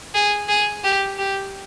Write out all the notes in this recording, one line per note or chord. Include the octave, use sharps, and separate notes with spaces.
G#4
G#4
G4
G4